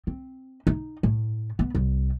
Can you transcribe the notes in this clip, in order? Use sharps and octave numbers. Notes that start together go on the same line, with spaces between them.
C4
D#4
A2
B3
C2